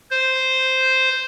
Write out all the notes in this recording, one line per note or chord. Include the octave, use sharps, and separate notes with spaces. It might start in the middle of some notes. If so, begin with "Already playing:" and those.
C5